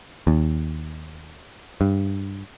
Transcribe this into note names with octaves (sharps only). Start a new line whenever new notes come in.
D#2
G2